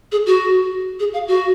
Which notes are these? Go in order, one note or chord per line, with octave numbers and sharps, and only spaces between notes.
G#4
F#4
G#4
F5
F#4